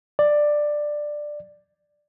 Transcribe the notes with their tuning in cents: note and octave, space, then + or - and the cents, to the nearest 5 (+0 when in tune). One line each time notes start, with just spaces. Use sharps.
D5 +10